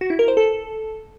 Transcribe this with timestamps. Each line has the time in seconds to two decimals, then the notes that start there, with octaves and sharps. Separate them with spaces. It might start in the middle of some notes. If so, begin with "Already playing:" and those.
0.01 F#4
0.10 E4
0.19 A#4
0.28 C5
0.37 A4